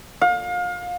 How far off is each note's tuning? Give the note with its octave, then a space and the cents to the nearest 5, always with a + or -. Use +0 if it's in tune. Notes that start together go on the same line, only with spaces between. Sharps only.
F5 +30